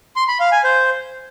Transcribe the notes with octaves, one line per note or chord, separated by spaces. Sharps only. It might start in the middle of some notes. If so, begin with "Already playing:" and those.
C6
B5
F5
G#5
C5